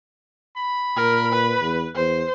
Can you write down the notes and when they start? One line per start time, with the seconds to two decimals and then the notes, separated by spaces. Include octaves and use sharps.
0.57 B5
0.96 A#2 A#4
1.33 B4
1.61 E2
1.95 E2 C5